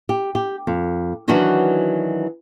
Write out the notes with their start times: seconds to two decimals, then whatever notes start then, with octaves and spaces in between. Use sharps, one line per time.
0.09 G4
0.35 G4
0.67 F2
1.28 D#3 E3 F#3 C#4 D4 F#4